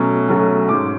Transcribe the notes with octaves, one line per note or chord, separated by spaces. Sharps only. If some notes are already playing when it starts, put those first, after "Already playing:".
Already playing: B2 F#3 A3 C#4
B1 B2 F#3 A3 C#4
G#2 F#3 C#4 D6